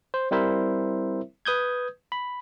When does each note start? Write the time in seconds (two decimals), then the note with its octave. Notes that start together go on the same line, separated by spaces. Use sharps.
0.14 C5
0.31 G3 C4 E4 A#4 C5 E5
1.45 B4 D#6 G6 G#6
2.12 B5